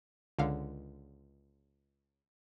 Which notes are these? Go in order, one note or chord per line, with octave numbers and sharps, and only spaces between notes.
C#2 D3 F5